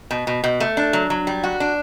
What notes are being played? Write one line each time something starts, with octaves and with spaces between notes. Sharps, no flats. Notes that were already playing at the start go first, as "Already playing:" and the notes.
B2
B2
B2
A3
D4
F#3
F#3
G3
F#4
D4